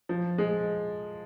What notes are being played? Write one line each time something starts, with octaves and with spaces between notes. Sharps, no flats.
F3
G#3